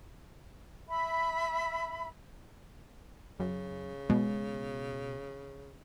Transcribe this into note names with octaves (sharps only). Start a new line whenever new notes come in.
E5 B5
F#2 C#3
B2 G#3 B3